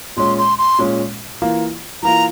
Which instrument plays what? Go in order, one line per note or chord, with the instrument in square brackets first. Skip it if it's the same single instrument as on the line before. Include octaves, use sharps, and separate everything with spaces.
[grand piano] A#2 G#3 C#4 [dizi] C6
[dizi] C6
C6
[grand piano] A#2 G#3 C#4
E3 A#3 F4
[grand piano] E3 A#3 F4 [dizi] A#5